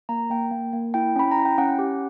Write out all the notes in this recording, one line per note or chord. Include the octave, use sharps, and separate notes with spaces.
A#3 A#5
A#3 G5
A#3
A#3
E4 G5
C#4 B5
A#5
E4
G5
C#4 F#5
G4